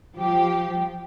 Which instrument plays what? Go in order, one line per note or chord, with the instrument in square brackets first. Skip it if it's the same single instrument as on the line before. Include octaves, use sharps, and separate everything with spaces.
[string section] F3 G4